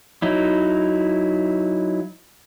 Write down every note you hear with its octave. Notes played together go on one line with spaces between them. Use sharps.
F#3 D#4 E4